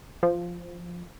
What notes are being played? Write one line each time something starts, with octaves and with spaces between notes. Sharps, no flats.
F3